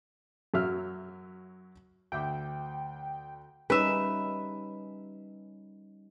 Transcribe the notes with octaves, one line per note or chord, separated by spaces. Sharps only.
F#2 F#3 E5 F6
D2 E5 G5 D6
G3 C#4 D#4 B4 E5